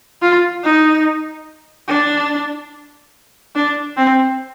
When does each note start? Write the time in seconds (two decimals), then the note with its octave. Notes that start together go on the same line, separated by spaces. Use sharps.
0.22 F4
0.63 D#4
1.88 D4
3.55 D4
3.97 C4